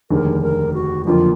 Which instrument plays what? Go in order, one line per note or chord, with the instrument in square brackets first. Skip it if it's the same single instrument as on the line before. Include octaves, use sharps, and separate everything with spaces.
[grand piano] F1 D#2 D3 G#3 [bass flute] A#4
[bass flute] A#4
F#4
[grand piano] F#1 F2 D3 F3 A#3 [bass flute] F4